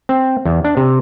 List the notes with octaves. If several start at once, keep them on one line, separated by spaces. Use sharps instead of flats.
C4
E2
D4
C3